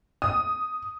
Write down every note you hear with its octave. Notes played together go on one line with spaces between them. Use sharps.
D#6